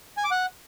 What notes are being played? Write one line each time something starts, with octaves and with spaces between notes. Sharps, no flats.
G#5
D6
F#5